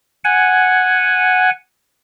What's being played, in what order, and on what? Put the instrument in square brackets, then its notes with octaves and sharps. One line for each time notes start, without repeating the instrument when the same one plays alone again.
[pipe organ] F#5 G#5